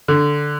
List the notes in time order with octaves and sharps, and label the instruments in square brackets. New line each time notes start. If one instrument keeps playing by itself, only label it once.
[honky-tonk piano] D3